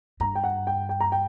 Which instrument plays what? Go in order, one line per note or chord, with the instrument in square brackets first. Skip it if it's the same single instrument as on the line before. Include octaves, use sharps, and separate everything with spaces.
[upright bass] G2 [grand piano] A#5
[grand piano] G5
F#5
G5
G5
A#5
G5